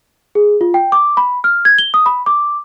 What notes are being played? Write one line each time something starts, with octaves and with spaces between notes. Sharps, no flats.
G#4
F4
G5
D6
B5
F6
G#6
G7
D#6
B5
D6